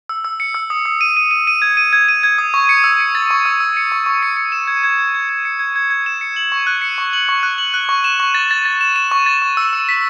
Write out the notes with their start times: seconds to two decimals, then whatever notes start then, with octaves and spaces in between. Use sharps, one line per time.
0.09 E6
0.25 E6
0.40 C#7
0.55 E6
0.70 D#6
0.85 D#6
1.01 D#7
1.17 D#7
1.31 D#7
1.47 D#7
1.62 G#6
1.77 D#7
1.93 G#6
2.08 D#7
2.23 G#6
2.38 D#6
2.54 C#6
2.69 C#7
2.84 E6
3.00 C#7
3.15 A6
3.31 C#6
3.45 E6
3.60 E6
3.77 C#7
3.92 C#6
4.06 C#6
4.23 C#7
4.37 C#7
4.52 E7
4.67 G#6
4.84 G#6
4.99 G#6
5.14 G#6
5.29 G#6
5.45 C#7
5.59 G#6
5.76 G#6
5.90 G#6
6.06 E7
6.21 C#7
6.36 F#7
6.52 C#6
6.67 F#6
6.82 C#7
6.98 C#6
7.13 F#7
7.29 C#6
7.43 F#6
7.58 F#7
7.74 F#6
7.89 C#6
8.04 E7
8.20 C#6
8.34 A6
8.51 A6
8.65 A6
8.81 E7
8.96 E7
9.11 C#6
9.26 A6
9.42 C#6
9.57 E6
9.73 E6
9.89 B6